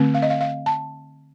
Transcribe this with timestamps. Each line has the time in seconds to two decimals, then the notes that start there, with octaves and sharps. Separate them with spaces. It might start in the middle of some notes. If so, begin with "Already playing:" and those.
Already playing: D3 A3 C4
0.14 F5
0.22 D#5
0.30 F5
0.41 F5
0.66 A5